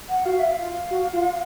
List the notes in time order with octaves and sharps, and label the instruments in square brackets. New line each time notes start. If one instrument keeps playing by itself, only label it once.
[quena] F#5
[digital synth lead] F#4 [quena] F5
[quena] E5
F5
[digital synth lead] F4
F#4
F4